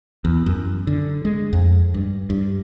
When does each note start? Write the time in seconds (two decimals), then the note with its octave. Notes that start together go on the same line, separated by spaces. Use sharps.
0.25 E2
0.46 F#2
0.87 D3
1.25 G#3
1.53 F2
1.94 G2
2.30 G2